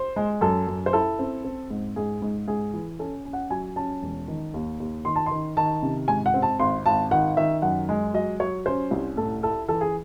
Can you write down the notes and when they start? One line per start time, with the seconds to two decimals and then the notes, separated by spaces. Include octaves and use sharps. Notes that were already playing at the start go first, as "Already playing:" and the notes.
Already playing: C5
0.16 G#3
0.41 F#2 A4
0.67 F#2
0.86 C5
0.93 E4 A4
1.19 C4
1.45 C4
1.70 G#2
1.96 G#2 G#4
2.22 G#2
2.48 G#2 G#4
2.74 E3
2.99 C#4 A4
3.25 C#4
3.33 F#5
3.50 F#3 G#5
3.76 C#4 A5
4.03 E1
4.28 D#3
4.54 D#2
4.80 D#2
5.05 D#3 C6
5.16 A5
5.26 D#3 C6
5.57 D#3 A5
5.83 C3
6.08 G#2 G#5
6.26 F#5
6.34 C4
6.42 A5
6.59 G#1 C6
6.86 G#1 A5
7.11 D#3 F#5
7.37 D#3 E5
7.62 F#2 F#5
7.89 G#3
8.14 F#3 D#5
8.40 F#3 C#5
8.66 C#4 C5
8.91 C2
9.17 A2 A4
9.43 E4 A4
9.68 E3 A4
9.81 G#4